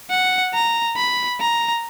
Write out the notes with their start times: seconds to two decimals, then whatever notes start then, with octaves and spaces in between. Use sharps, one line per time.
0.10 F#5
0.54 A#5
0.97 B5
1.40 A#5